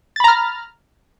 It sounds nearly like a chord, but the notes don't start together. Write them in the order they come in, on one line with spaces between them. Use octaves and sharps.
A6 B5 A#5 F6